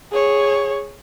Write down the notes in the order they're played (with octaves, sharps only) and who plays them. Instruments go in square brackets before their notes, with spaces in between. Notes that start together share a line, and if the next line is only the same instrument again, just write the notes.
[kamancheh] G#4 C#5